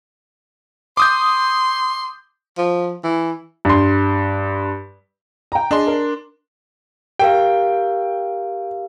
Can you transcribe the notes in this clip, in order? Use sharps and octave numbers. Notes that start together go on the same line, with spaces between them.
C6 D6 D#6 G6
F3
E3
G2 C6
G5 A#5
D4 G#4 D5 D#5 C6
A#4
G4 A#4 F5 G5